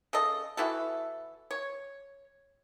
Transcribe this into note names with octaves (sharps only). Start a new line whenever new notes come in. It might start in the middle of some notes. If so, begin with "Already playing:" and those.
C#3 A4 D#5
E3 E4 F#4 A4
C#5